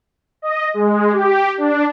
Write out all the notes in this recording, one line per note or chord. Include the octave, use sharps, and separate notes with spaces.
D#5
G#3
G4
D4